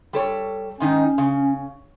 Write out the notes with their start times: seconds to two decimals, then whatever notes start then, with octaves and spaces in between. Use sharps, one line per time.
0.13 G3 A4 C#5
0.80 G#2 D#3 C#4 D#4
1.18 C#3